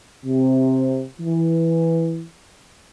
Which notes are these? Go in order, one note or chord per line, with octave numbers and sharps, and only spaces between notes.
C3
E3